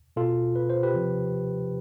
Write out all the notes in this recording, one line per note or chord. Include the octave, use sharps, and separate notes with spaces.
B2 F4 A4
B4
C5
G4 B4
C3 F3